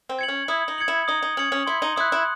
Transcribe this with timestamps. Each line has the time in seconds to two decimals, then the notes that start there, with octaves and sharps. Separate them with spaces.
0.09 C4
0.19 G#6 C#7 F#7
0.28 C#4
0.48 E4 D#6
0.68 D#4
0.78 G#6 C#7 F#7
0.88 E4
1.08 D#4 D#6
1.22 D#4
1.37 C#4 G#6 C#7 F#7
1.52 C#4
1.67 E4 C6
1.82 D#4
1.96 E4 D#6 F#6
2.12 E4